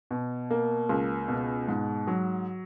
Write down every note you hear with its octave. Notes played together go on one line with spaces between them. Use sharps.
B2
A#3
C#2
B2
G#2
F#3